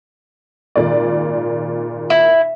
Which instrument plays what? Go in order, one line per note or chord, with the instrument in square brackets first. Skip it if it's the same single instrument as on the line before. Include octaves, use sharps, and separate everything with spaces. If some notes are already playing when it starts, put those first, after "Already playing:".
[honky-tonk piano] G#1 A#2 D5
[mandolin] E4